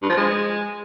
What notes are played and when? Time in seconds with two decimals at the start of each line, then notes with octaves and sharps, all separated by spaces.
0.03 G2
0.10 F3
0.17 G#3